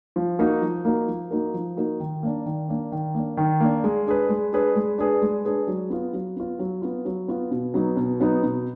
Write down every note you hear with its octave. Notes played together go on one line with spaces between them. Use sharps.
F3
A#3 D#4 F#4 A#4
F3
A#3 D#4 F#4 A#4
F3
A#3 D#4 F#4 A#4
F3
A#3 D#4 F#4 A#4
D#3
A#3 D4
D#3
A#3 D4
D#3
A#3 D4
D#3
A#3 D4
G#3
D4 G#4 B4
G#3
D4 G#4 B4
G#3
D4 G#4 B4
G#3
D4 G#4 B4
F#3
B3 F4
F#3
B3 F4
F#3
B3 F4
F#3
B3 F4
B2
F#3 B3 D#4
B2
F#3 B3 D#4
B2